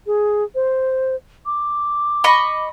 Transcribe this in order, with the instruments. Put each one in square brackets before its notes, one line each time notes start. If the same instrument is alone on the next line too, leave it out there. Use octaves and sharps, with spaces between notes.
[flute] G#4
C5
D6
[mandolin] D#5 B5 C#6